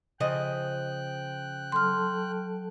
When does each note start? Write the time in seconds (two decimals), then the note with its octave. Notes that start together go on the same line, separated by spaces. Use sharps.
0.20 C#3 F3 D#5 G5 F#6
1.72 F#3 A4 A5 C6 F6